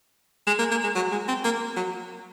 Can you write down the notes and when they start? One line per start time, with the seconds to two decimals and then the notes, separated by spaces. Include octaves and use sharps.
0.47 G#3
0.59 A#3
0.71 A#3
0.83 G#3
0.95 F#3
1.12 G#3
1.28 C4
1.44 A#3
1.76 F#3